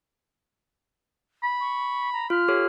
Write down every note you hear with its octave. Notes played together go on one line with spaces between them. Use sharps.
B5
C#6
A#5
F4 F6
G4 A4 C#5